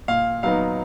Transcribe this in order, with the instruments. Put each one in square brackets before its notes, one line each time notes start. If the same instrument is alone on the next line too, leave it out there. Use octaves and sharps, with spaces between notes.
[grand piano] A#2 F5
F#3 B3 D#4 F5